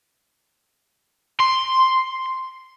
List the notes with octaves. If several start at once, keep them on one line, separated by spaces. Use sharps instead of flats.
C6